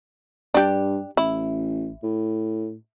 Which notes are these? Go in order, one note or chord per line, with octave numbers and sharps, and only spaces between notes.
G2 D4 G4
A1 E4
A2